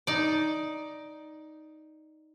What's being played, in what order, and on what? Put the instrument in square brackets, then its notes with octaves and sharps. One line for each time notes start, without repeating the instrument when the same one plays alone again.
[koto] D#4 D5